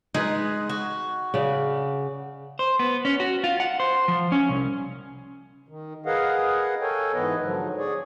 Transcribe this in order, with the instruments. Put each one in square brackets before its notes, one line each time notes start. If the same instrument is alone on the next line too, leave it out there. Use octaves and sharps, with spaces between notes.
[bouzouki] G#3 [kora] D#4 B4
[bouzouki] F#4
[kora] C#3 D5
[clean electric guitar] C5
B3
C#4
F#4
F4
F#5
C5
F3
C#4
C2
[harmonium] D#3
G#4 A#4 B4 D#5 F5 F#5
A4 A#4 C#5 G5 G#5
G#2 E3 B3 B4 D#5
G#2 D3 F3 F#3
G#4 C#5 D5